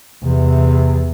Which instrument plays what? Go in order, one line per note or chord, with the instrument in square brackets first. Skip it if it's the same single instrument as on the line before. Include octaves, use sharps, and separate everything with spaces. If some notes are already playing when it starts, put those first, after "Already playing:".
[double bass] E2 [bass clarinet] C3